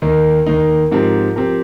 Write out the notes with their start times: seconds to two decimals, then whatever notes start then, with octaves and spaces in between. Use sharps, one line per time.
0.02 D#2 D#3 A#3 D#4
0.47 D#2 D#3 A#3 D#4
0.92 G#2 F3 C4 G4 A#4
1.36 F3 C4 G4 A#4